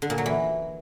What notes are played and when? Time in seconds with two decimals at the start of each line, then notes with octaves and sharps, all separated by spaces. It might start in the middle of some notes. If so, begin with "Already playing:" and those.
0.02 D3
0.10 A#2
0.18 F#3
0.26 E3